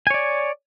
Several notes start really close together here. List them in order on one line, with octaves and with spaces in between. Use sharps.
G#5 C#5 D5